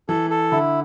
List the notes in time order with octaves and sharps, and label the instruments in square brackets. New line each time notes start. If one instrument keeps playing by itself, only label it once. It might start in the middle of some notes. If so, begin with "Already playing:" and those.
[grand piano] E3 [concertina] A4
[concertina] A4
[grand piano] D3 [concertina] E4